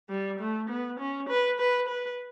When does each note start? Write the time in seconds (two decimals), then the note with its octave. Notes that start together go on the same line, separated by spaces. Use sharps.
0.10 G3
0.40 A3
0.69 B3
0.99 C#4
1.29 B4
1.59 B4
1.88 B4